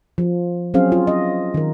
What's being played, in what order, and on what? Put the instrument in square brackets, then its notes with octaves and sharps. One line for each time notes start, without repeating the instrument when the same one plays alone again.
[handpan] F3
F#3 C4 C#4 G#4 C5 F5
F4
D#5
D#3 A#4